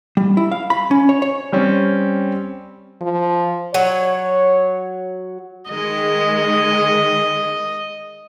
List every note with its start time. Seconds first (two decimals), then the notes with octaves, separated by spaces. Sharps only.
0.17 G3
0.37 E4
0.52 F5
0.70 B5
0.91 C#4
1.09 C#5
1.22 C#5
1.52 G3 C4 C#4
3.01 F3
3.74 F#3 C#5
5.70 D#3 G#3 D#5